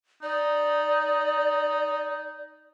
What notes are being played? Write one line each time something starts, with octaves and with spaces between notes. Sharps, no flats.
D#4 D5